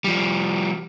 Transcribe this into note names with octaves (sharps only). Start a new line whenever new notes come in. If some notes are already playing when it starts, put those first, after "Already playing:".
F3 G3